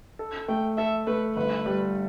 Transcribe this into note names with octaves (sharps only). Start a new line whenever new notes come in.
A4
A3 G5
A4 E5
A3 B4
G1 B4
G3